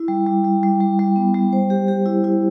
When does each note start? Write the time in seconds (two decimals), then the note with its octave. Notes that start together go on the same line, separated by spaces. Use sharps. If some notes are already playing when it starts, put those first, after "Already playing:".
Already playing: E4
0.08 G3
0.26 G3
0.45 G3
0.63 G3
0.81 G3
0.99 G3
1.16 B3
1.34 G3
1.53 C5
1.70 G4
1.88 G4
2.06 E4
2.24 E4